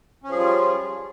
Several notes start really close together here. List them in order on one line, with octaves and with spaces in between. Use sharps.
C#4 F3 G#4 G3 F4